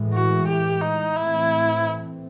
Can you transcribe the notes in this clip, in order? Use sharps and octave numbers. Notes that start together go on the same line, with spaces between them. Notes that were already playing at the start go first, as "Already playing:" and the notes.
Already playing: A2 E3 G#3
F#4
G4
D#4
A2 E3 A3 C4 E4